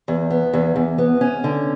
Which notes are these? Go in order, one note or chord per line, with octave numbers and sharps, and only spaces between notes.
E2
B3
E2
E2
B3
C#4
D3